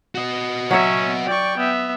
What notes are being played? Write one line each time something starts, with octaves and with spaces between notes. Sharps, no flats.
F#4 D#5
F#3 C#4 C#5 E5
D5 G5 C#6
B3 E5